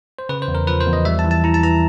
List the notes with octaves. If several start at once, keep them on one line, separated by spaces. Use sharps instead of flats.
C5
C#3 B4
C5
E2
A#4
F3 B4
C5
E2
D#5
G3 E5
A5
E3
A5
E4 A#5
A5
E3 A#5